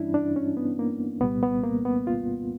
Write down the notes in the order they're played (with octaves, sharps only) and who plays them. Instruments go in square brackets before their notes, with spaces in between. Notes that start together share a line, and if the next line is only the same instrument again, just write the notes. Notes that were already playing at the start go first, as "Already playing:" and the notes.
Already playing: [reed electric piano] G2 E3 G3 C#4 D4 E4
D4
C#4
B3
A#3
C2 A#2 G3 B3
B3
A#3
B3
F4